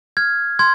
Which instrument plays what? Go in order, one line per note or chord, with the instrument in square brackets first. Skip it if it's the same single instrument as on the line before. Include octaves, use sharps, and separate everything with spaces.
[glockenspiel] F6 G#6
C6 G#6